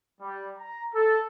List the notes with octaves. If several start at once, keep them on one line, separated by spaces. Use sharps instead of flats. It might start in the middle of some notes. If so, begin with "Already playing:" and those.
G3
A#5
A4